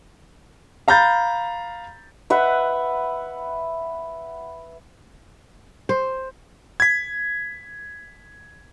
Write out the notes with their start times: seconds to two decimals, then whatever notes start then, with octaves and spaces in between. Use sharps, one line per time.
0.88 F5 A#5 B5 G6 A6
2.30 B4 E5 F#5
5.89 C5
6.80 G#6 B6